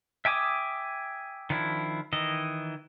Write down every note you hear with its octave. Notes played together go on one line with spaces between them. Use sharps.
E5 G5 G#5 D6 D#6
D#3 F3 D4 E4
D#3 E3 D#5